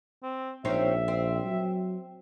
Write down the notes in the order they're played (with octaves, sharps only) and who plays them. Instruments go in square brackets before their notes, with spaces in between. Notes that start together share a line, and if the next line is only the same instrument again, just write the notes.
[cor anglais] C4
[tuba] A#1 [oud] C4 C#4 D#4 [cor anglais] E5
[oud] C4
[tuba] F#3